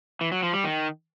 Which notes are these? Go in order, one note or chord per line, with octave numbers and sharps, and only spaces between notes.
E3
F#3
F3
G3
D#3